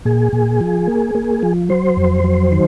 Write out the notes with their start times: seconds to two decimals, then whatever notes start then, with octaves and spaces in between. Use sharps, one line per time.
0.05 A#2 G#4
0.33 A#2
0.61 F3
0.87 A#3
1.15 A#3
1.43 F3
1.69 F#3 C5
1.97 F2
2.24 F#3
2.52 D#3